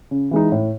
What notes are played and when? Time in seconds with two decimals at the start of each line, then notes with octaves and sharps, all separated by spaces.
0.11 C#3
0.31 E3 G#3 D#4
0.52 A2